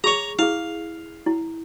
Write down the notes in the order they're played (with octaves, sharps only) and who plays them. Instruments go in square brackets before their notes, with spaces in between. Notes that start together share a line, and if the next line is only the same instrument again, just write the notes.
[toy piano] G#4 C#6 [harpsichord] C#5 A#5
[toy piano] E4 G#4 [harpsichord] F5
[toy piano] E4